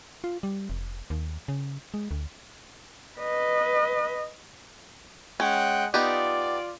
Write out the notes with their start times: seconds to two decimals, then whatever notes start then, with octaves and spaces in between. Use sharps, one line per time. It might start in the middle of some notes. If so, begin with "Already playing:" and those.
0.24 F4
0.43 G3
0.70 F1
1.10 D#2
1.48 C#3
1.94 G#3
2.11 D2
3.19 B4 D#5
5.40 G#3 C#4 F#5 G5
5.94 B3 D#4 F4 G4 D5